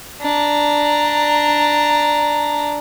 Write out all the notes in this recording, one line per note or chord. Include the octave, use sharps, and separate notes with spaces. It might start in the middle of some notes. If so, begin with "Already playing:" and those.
D4 A#5